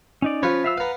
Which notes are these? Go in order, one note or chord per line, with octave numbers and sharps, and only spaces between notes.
C#4 D#4 D5
F3 C#4 F4 B4 C#5 C#6
E5 F5 E6
B3 B4 F5 A#5